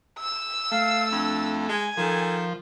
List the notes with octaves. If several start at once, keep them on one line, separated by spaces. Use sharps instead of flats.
E6
A3 F5
F2 D4
G#3 G#5
D#3 F3 A4